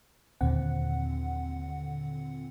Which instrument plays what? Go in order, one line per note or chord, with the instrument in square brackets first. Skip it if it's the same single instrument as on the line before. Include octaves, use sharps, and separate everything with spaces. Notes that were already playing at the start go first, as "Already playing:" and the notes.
[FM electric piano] D#2 A#2 D3 C4 F#5